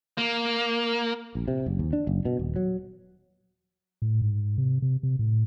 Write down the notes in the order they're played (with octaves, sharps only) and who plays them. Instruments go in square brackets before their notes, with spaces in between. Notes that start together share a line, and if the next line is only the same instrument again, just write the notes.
[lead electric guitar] A#3
[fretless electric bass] A#1
C3
F#1
D#2
D4
F#1
B2
D#1
F#3
[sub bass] A2
G#2
C3
C3
C3
A2